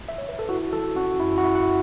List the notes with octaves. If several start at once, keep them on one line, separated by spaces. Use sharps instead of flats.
E5
C#5
B4
A4
E4 F#4
E3 A4
C#4 F#4
F#2 E4
F#4
E4
F#5